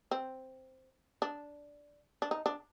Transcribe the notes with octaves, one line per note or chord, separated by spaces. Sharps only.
C4
D4
D4
D#4
D4